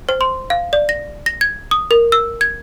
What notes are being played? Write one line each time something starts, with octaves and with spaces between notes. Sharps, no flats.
C5
C6
F5
D5
A#6
A#6
G#6
D#6
A#4
E6
G#6